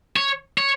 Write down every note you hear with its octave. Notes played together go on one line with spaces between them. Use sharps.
C#5
C#5